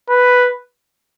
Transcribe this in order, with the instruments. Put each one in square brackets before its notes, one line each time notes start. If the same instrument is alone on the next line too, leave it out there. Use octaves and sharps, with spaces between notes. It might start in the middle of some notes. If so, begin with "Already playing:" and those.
[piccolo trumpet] B4